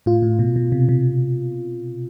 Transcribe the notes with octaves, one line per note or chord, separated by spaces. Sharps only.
A2 F4
A2
B2
B2
C3
C3